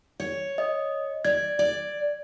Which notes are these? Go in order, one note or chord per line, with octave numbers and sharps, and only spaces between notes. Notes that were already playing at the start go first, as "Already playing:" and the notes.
C#5
D#5
D5 G#6
D5